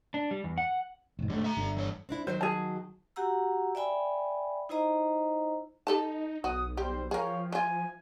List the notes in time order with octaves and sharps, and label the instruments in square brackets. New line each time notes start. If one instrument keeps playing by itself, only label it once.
[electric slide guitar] D4
G3
E2
F#5
[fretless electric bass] E1 G#2
[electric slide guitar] G#2 D3 [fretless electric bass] G3 A3
[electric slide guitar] E5 A#5
[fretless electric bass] G1 D3
[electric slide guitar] E3 C#5
[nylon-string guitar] C4 D4 E4
[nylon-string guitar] D#3 F#3 F#4 [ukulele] C5
[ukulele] G#4 A5
[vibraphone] F#4 G4 F#5 A#5 E6
D5 E5 G5 G#5 B5
D#4 E4 C5 D#5 A#5
[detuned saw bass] D#4 [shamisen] G4 A4 A5
[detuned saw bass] B1 [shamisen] F#4 [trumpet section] F#5 D#6
[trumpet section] G3 C4 C5 [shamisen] G4
[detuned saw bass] F3 [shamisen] G#4 A#4 [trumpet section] C#5 F5 G5
[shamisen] E3 F4 [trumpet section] G#5